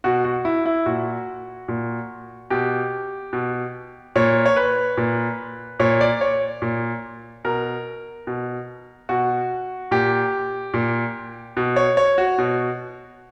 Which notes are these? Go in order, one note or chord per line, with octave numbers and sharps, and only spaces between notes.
B2 F#4
F#4
E4
E4
A#2 F#4
A#2
B2 G4
B2
A#2 C#5
C#5
B4
A#2
A#2 C#5
D5
C#5
A#2
B2 A#4
B2
B2 F#4
A#2 G4
A#2
B2
C#5
C#5
F#4
B2